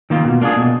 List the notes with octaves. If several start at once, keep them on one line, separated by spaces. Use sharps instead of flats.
D#3 A#3 F4
B2
A#3 D4 F4 G#4
B2